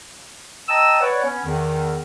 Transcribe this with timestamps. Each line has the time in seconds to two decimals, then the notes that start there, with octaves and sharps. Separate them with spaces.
0.68 D#5 G5 A5 A#5 D#6 E6
1.01 B4 C#5 D5 F#5
1.23 B3 C#4
1.45 E2 D#3